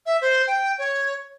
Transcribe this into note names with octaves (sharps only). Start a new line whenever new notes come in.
E5
C5
G5
C#5